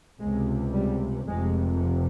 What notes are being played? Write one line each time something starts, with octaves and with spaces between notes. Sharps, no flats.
C#2 C3 G#3
G3
F1 F2 C3 G#3